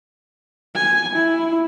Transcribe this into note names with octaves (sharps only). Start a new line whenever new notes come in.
G#5
E4